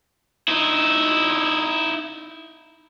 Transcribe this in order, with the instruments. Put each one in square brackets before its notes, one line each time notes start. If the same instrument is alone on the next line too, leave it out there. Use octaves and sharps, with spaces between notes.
[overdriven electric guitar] D#4 E4